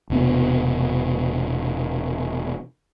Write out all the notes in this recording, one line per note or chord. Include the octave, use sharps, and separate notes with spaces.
E1 C3 B3